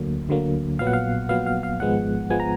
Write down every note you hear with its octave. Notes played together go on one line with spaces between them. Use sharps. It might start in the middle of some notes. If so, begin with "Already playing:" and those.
Already playing: D2 D3 F#3 A#3
D2 D3 F#3 A#3
A#1 A#2 F#3 B3 F5
F#5
F5
A#1 A#2 F#3 B3 F5
F5
F5
G#1 G#2 F3 G#3 B3 F#5
F3 G#3 B3 G#5
A#5